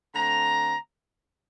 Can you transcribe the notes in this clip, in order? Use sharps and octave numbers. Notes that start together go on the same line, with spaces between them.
D3 A3 C4 A#5